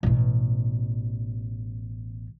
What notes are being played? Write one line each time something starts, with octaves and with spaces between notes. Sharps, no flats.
A1 B2